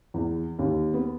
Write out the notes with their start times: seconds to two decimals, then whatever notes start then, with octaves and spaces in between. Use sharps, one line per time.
0.14 E2
0.59 D#2
0.94 B3